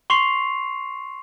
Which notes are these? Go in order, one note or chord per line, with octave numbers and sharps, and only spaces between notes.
C6 C#6 C7 F7